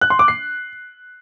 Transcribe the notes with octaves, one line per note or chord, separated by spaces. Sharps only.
F#6
C6
D6
C7